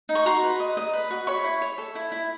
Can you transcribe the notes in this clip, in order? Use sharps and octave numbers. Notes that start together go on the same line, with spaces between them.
D#4
C#6
F#4 A#5 C6
B4
D#5
D#5
B4
F#4
C#5 B5 C#6
E4
C#5
A4
E4
E4